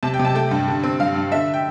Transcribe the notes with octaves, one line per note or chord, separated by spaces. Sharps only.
C3 A5
G5
C3
A5
A3 G5
G2
D3
C4
G2 F5
G2
D3 E5
G5